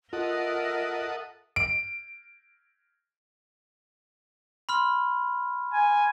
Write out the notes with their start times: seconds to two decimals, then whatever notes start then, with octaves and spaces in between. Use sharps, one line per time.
0.13 F4 A4 A#4 D#5 E5 F#5 D#6
1.56 D7
4.69 B5 C6 F6
5.73 G#5